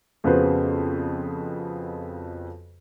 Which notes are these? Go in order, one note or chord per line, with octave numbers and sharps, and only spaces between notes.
F2 C#3 B3 F#4 B4 C5